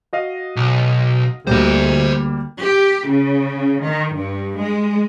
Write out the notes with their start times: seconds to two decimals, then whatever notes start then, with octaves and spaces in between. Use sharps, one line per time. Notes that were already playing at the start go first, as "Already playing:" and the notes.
0.13 F#4 D#5 F5
0.56 B1
1.47 D2 G3 A#3 C5 D#5
2.61 G4
3.09 C#3
3.87 D#3
4.16 G2
4.61 G#3